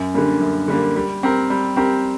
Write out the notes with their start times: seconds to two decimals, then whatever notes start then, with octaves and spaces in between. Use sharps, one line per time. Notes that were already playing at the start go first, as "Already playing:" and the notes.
Already playing: F#2
0.14 D3 G3 A#3
0.41 F#2
0.68 D3 G3 A#3
0.96 G3
1.23 C4 G4 A#4
1.50 G3
1.76 C4 G4 A#4